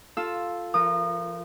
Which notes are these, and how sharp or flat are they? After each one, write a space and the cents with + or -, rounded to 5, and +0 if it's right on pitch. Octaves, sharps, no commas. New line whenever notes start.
F4 +0 A4 +0 E6 +0
F3 -35 A#4 +0 D#6 -30